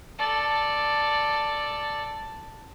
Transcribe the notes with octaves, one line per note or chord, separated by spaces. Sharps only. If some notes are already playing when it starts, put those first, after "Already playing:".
A4 D5